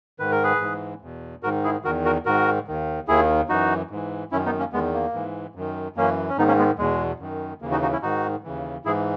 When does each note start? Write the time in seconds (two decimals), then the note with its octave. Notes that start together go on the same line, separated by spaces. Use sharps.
0.19 G#2 D#3 B4
0.31 A#4
0.43 G#4 B4
0.61 G#2 E3
1.02 E2 B2
1.43 G#2 D#3 F#4 A#4
1.64 E4 G#4
1.85 E2 D#3 F#4 A#4
2.05 F#4 A#4
2.26 G#2 D#3 F#4 A#4
2.68 D#2 D#3
3.08 D#2 D#3 E4 G#4
3.49 F#2 E3 D#4 F#4
3.91 G#2 E3
4.32 F#2 D#3 C#4 E4
4.46 B3 D#4
4.59 A#3 C#4
4.73 E2 D#3 G#3 B3
4.94 A#3
5.14 G#2 E3
5.55 F#2 D#3
5.96 F#2 E3 A#3 C#4
6.29 C#4
6.38 G#2 D#3 B3 D#4
6.48 A#3 C#4
6.58 G#3 B3
6.78 E2 B2 G#3
7.20 F#2 D#3
7.62 D#2 C#3 E3 A#3
7.71 D#4 F#4
7.82 D#4 F#4
7.92 C#4 E4
8.02 G#2 D#3 D#4 F#4
8.44 D#2 C#3 E3
8.85 G#2 E3 E4 G#4